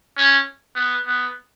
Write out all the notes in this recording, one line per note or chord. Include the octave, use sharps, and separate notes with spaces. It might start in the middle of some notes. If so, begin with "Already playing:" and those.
C#4
B3
B3